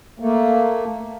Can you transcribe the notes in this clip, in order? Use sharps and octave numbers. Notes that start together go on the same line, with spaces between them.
A3 A#3